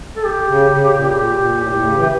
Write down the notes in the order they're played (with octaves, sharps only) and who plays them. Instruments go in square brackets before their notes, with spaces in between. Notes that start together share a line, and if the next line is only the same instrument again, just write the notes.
[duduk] A4
G4
[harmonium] C#3
C#3
A#2
[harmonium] A#2 [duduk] G4
[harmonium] A#2
[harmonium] A2 [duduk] G4
[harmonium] A2
C#3
E3
[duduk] G4